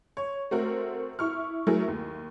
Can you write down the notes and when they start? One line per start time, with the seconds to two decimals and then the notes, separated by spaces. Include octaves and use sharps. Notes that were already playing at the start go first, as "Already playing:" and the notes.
0.17 C#5
0.51 A3 C4 F#4 A#4
1.19 E4 C#6 F6
1.67 F#3 A3 E4 G#4 A#4
1.88 D#2